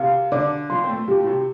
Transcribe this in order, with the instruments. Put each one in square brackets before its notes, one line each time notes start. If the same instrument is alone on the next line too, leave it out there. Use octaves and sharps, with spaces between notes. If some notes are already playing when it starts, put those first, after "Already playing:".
Already playing: [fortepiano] C3 [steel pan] F5
[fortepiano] D3 [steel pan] D5
[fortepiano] F3 [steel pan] C6
[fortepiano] C4
A3
[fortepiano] F3 [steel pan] G4
[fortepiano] A2
C3